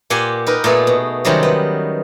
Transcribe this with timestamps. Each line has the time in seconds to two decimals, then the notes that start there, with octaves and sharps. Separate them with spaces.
0.10 A#2 G4 F#5 G#5 C6
0.47 D#4 A#4 B4
0.64 A#2 A3 B3 G#4 A4
0.87 B2
1.25 C3 D#3 F#3 G3 C4 C#4
1.43 B3